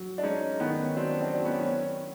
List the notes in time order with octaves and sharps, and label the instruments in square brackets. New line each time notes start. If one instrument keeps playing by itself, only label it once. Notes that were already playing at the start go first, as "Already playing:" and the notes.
Already playing: [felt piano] F#3
[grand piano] D4
[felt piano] G#3 [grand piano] C#4 D#4
[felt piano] D#3 [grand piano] B3 C#4
[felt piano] F#3 [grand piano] C4 D4
[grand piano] C4 D4
[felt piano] F#3
[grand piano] B3 C#4
C#4